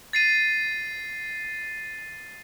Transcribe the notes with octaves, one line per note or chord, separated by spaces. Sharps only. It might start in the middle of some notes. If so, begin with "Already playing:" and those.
A6 C7 D#7